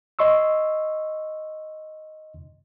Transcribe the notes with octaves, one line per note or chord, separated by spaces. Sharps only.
D#5 C6 C#6 E6